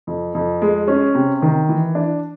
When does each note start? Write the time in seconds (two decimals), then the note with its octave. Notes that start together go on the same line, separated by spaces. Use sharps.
0.07 F2
0.35 F2
0.62 G#3
0.88 C#4
1.15 C3
1.42 D#3
1.69 E3
1.95 D4